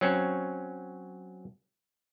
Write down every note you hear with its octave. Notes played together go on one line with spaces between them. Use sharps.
F#3 C4 C#4